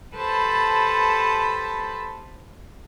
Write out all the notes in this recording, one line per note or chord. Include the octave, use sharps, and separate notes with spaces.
G4 A4 B4 C5 A5 B5